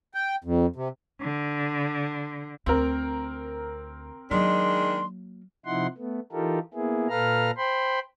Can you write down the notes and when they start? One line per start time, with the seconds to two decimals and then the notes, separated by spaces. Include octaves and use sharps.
0.14 G5
0.44 F2
0.76 C3
1.21 D3
2.66 D2 C4 A#4
4.31 D#3 F#3 G#3 A#3 D4 C6
5.66 C3 F3 D#4 E4 F#5 C6
5.98 A3 B3
6.32 E3 D#4 F4 G4 A4 A#4
6.74 A#3 B3 E4 G#4
7.09 A#2 A4 B4 F5 A#5 F6
7.57 C5 G5 B5 C6